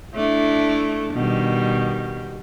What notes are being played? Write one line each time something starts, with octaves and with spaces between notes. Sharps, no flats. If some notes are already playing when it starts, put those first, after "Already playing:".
A3 D4 E4
B2 D#3 G3